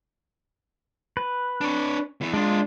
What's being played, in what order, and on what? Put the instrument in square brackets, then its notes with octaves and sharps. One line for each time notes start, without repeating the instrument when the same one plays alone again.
[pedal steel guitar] B4
[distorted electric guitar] D4 C#5
E2 E3
[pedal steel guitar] G#3 [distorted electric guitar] D4 F4